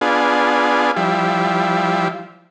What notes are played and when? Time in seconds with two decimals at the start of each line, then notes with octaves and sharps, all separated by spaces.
0.01 B3 D4 F4 G#4
0.96 F3 G3 E4